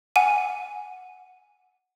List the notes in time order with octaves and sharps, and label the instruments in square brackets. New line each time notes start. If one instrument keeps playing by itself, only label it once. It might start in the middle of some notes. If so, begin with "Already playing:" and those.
[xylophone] F#5 G#5 D#7